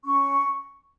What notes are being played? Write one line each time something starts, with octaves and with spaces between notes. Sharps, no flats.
C#4 C#6